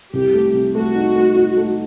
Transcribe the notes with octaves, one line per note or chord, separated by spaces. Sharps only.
C2 G4
A3
C2
A3 F#4
D#4
A3
D#4
A3